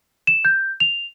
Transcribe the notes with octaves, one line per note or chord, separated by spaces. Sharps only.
E7
G6
F7